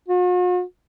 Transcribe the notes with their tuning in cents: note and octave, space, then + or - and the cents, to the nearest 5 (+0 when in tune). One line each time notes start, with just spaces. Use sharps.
F#4 -45